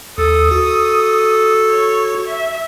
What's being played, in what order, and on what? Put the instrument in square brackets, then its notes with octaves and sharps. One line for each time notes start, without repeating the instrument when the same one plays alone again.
[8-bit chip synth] D#2 [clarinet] A4 [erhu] D#6
[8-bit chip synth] F#4 [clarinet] A4
[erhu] C#5
E5